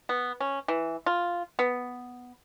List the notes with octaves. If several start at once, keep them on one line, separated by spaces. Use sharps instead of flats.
B3
C#4
E3
F4
B3